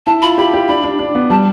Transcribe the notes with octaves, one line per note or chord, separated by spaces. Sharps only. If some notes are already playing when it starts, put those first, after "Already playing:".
E4 A5
F4 B5
G4 B5
G4
D4 B5
D4
D4
B3
G3 A5